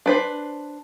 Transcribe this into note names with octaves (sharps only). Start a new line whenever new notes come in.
D4 B4 C5